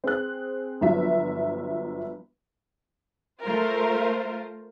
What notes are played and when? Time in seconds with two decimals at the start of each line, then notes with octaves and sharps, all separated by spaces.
0.04 C4 G#4 F#6
0.81 G1 F3 F#3 E5 B6
3.43 A3 F4 A#4 C5